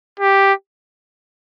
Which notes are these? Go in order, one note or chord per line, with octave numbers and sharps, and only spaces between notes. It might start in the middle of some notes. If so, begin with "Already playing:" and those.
G4